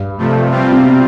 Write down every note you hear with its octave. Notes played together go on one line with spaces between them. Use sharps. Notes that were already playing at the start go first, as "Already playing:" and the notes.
Already playing: G2
C3 F3 A3
G3 C4 F4
C3
B2